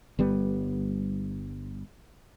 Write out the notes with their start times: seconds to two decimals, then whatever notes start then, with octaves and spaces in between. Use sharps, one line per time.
0.19 G1 G3 B3